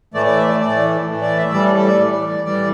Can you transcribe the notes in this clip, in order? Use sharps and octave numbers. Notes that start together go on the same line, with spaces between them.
A2 E3 A3 D5
D5
E5
D5
A2 E3 A3 D5
A2 E3 A3
D5
E5
A2 E3 G3 D5
A4
A4
D5
A2 E3 G3
A2 E3 G3 D5